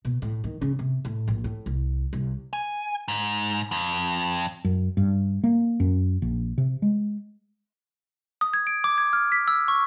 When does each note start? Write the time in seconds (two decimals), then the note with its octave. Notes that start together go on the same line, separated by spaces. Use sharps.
0.05 B2
0.22 A2
0.44 D#3
0.62 C#3
0.79 C3
1.05 A2
1.28 A#1
1.44 A2
1.66 C2
2.13 C2
2.53 G#5
3.08 G#2
3.71 F2
4.65 F#2
4.97 G2
5.44 A#3
5.80 F#2
6.22 A#1
6.58 C3
6.82 G#3
8.41 D#6
8.54 G#6
8.67 D7
8.84 D6
8.98 G#6
9.13 F6
9.32 B6
9.48 E6
9.68 C#6